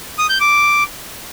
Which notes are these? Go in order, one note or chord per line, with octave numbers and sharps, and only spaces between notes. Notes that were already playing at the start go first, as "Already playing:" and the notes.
D#6
G6
D6